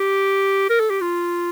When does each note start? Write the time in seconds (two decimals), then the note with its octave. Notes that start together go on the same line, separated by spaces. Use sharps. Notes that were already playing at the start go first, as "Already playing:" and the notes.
Already playing: G4
0.70 A#4
0.80 A4
0.90 G4
1.01 F4